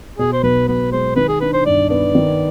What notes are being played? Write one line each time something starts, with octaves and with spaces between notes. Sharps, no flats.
B2 G#4
C5
B1 B4
B1 B4
G#3 C5
D#3 B4
G#4
D4 B4
C5
G2 D5
B3 D5
D#3